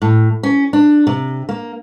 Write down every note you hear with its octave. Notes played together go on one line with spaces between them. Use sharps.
A2
C#4
D4
C3
A#3